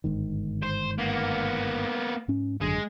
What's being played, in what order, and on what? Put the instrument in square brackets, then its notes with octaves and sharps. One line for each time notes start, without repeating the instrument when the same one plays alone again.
[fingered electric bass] G1 G#2 D#3
[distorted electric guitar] C5
A#3 B3
[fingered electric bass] G#2 C#4
[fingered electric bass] G#1 F#2 D3 [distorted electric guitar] G#3